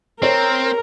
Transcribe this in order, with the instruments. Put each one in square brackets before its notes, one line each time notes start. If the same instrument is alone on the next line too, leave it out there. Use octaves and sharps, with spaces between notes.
[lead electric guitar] C4 [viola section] A#4 [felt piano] C5 C#5